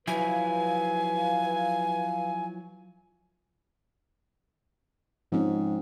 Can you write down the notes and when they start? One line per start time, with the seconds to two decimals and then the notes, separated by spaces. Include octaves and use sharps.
0.07 F3 F#3 E4 B4 F5 G#5
5.32 G#2 F3 C4 C#4